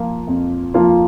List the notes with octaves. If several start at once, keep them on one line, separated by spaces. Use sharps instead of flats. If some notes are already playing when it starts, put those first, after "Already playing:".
Already playing: F3 A#3 F4
F2
F3 A#3 F4